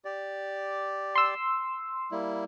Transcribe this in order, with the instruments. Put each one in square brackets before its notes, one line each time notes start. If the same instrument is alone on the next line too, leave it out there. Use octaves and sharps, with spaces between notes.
[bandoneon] G4 D5
[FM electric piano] C6 E6
[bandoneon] G3 A#3 E4